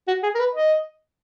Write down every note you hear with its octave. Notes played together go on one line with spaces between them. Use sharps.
F#4
G#4
A#4
B4
D#5